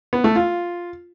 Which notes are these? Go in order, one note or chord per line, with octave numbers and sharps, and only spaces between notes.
B3
A3
F4